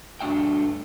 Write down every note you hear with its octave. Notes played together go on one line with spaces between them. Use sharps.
G2 A3 D4 F#4 E5 G5